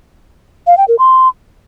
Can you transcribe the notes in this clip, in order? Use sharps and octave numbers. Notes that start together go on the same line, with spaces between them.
F5
G5
A#4
C6